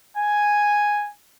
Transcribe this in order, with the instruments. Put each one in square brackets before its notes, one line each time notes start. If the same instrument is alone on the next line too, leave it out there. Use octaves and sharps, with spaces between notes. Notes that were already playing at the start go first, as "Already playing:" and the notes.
[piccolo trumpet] G#5